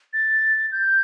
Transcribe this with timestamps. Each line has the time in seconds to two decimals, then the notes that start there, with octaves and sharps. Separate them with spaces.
0.13 A6
0.72 G6